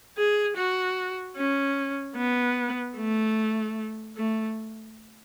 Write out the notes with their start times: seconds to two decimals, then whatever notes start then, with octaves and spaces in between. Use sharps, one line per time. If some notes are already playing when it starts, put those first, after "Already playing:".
0.17 G#4
0.57 F#4
1.37 C#4
2.16 B3
2.97 A3
4.17 A3